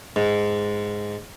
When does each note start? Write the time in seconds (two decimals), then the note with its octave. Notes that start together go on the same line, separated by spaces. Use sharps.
0.16 G#2